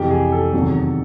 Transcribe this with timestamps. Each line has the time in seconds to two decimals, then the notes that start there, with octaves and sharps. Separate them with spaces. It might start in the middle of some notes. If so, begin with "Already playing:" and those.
Already playing: F2 C3 E3 G4
0.10 G#4
0.32 A4
0.53 E2 C3 D#3 F#3